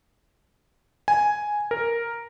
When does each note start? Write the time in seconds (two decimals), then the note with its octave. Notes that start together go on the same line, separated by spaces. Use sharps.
1.08 G#5
1.71 A#4